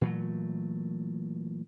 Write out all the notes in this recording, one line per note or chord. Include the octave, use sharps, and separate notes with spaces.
A#2 E3 F#3 A3